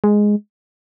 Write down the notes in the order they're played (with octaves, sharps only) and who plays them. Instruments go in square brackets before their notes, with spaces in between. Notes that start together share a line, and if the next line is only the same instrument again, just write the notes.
[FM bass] G#3